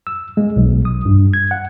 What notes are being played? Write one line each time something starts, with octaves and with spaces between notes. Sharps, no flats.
E6
G#3
B1
D#6
G2
G#6
F#5